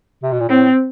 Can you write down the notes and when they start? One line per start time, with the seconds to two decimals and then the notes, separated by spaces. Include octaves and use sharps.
0.23 C3
0.32 B2
0.40 A#2
0.49 A2 C4